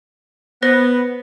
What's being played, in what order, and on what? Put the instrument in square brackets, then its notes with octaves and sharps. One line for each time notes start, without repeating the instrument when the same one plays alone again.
[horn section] B3 [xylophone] C5 F#6 A#6